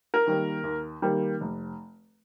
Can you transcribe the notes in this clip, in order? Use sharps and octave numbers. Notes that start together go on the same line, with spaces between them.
A#4
D#3 G3 A#3
D#2
D#3 G3 A#3
F1